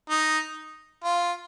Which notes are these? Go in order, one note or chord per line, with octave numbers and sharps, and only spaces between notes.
D#4
F4